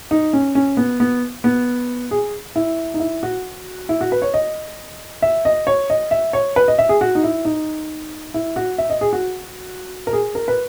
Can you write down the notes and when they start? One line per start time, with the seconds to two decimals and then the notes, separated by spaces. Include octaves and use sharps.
0.11 D#4
0.33 C#4
0.55 C#4
0.77 B3
1.00 B3
1.44 B3
2.11 G#4
2.56 E4
2.94 D#4
3.00 E4
3.23 F#4
3.89 E4
4.01 F#4
4.12 B4
4.22 C#5
4.34 D#5
5.22 E5
5.45 D#5
5.67 C#5
5.90 D#5
6.11 E5
6.33 C#5
6.56 B4
6.68 D#5
6.78 E5
6.89 G#4
7.01 F#4
7.15 D#4
7.23 E4
7.45 D#4
8.34 E4
8.56 F#4
8.78 E5
8.90 D#5
9.01 G#4
9.13 F#4
10.07 A#4
10.13 G#4
10.35 A#4
10.48 B4